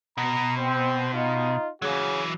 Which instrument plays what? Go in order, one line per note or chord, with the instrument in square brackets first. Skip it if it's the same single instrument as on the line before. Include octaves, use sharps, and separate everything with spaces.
[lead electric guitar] B2 [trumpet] A#5
[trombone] C4 [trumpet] C5
[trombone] D#4 [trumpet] F4
[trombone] C#3 [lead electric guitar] E3 F#3 [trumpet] F#4